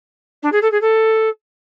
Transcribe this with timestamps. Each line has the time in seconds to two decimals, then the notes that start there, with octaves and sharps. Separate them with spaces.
0.43 D4
0.52 G#4
0.62 A4
0.72 G#4
0.81 A4